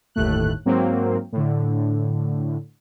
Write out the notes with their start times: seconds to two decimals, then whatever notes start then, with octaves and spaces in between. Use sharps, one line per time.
0.15 G1 D#2 A2 A3 F#6
0.65 G#2 F#3 A#3 C4
1.32 A2 D3